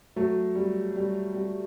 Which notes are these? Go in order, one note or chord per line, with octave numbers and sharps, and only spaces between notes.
F#3 A3
G3
G3
G3